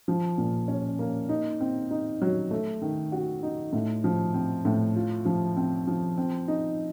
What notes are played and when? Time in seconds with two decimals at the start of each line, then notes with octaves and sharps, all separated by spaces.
0.08 F3
0.38 A#2
0.68 C#4
0.99 A#3
1.29 D#4
1.60 C4
1.91 D#4
2.22 F#3
2.51 A3
2.82 D#3
3.12 F#4
3.43 D#4
3.73 A2
4.04 F3
4.34 C4
4.65 A2
4.96 F4
5.25 F3
5.57 C4
5.87 F3
6.18 C4
6.48 D#4